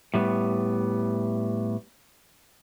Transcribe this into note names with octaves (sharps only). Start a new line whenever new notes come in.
A2 G3 B3